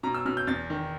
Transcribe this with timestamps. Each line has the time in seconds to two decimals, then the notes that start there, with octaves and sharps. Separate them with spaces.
0.03 B2 A#5
0.14 E6
0.25 B2 F6
0.37 G6
0.47 E2 A6
0.70 D#3